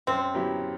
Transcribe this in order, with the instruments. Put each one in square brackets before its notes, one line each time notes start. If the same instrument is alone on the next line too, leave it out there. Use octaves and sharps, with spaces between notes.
[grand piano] F#2 [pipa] C4
[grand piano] F#3 B3 E4 G4